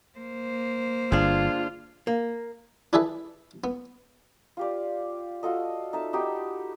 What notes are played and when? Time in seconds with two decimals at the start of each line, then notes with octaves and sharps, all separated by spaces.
0.19 A#3 C5
1.12 G1 D4 F4 G#4
2.07 A#3
2.93 D4 E4 G#4 A4 B4
3.64 B3
4.57 F4 G4 D5
5.43 F4 F#4 A4 D#5
5.93 D#4 A4 E5 A5
6.13 D#4 F#4 G4 B5